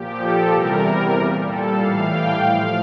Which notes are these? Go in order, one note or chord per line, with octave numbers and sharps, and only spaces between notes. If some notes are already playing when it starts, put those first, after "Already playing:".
Already playing: A#2 F3 G4
A4
E2 C3 E3 G3 A#4
A#2 G3
A4
A2 E3 G3 F5
G5
A2 F3 F5